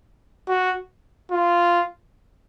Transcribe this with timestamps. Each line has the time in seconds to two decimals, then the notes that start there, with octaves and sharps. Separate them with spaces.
0.48 F#4
1.31 F4